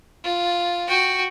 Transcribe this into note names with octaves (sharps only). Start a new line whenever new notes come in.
F4
F#4 G5